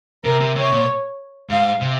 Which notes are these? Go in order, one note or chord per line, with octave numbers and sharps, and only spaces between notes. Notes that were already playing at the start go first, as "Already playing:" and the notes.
C3 A#4
C3
C3 C#5
A#2
G#2 F5
C3